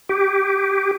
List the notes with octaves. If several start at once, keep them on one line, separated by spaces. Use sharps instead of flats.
G4